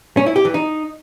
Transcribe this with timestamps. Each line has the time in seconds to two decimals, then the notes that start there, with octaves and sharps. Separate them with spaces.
0.17 C#4
0.26 E4
0.36 G4
0.45 E3
0.54 D#4